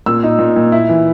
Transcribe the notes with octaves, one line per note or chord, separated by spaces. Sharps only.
A#2 E6
D#4
A#2
A#2
E4
E3